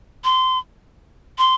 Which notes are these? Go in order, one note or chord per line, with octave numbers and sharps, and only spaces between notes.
C6
C6